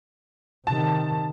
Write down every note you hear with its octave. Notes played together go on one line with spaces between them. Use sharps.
C3 D#3 A5